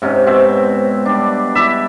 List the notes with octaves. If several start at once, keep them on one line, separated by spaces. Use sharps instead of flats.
G#2 C3 C#4
B2 C4 C#5 E5
G3 D4
E4 D5 E5 B5